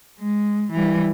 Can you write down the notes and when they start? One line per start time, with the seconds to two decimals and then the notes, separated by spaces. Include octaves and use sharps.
0.19 G#3
0.72 E3 G3